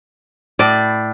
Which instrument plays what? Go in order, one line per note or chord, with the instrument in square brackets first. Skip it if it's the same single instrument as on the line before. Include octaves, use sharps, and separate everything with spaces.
[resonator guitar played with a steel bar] A2 [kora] D5